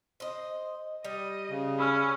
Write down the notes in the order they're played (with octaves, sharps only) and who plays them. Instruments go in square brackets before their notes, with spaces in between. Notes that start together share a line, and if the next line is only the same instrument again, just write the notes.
[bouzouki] C5 D#5
[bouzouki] G3 [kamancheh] D#5
[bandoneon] C#3
[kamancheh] C#4 [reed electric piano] B5 E6 F6